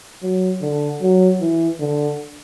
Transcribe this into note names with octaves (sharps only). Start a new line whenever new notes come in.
F#3
D3
F#3
E3
D3